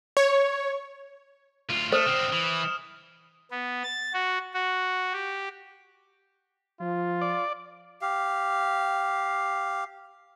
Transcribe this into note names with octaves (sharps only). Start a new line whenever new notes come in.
C#5
D2 F4
A3 C5 D#6 F6 E7
D3 C4
E3
B3
A6
F#4
F#4
G4
F3 F4
D5
G4 F5